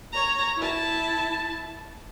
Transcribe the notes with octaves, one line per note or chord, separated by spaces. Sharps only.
C#5 A#5
E4 A5